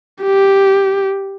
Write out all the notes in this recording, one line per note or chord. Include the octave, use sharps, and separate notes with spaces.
G4